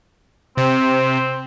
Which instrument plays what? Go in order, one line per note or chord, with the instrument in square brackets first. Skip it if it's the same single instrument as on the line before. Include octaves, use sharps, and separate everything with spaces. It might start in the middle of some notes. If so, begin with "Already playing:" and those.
[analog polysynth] C3 [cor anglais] C4